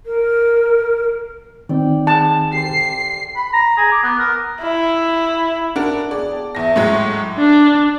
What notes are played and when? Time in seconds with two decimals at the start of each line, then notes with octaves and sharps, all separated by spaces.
0.06 A#4
1.69 D#3 C4 D#4 D5 G5
2.07 G#4 F5 A5
2.52 G4 A4 C5 C7
3.36 B5
3.53 A#5
3.77 G#4
3.92 D6
4.04 B3
4.19 A#4
4.61 E4
5.76 D4 F#4 A#4
6.11 B3 G#4 D5
6.31 G5 A5
6.55 E2 E5 A#6
6.76 A2 F#3 G#3
7.00 B5 D6
7.38 D4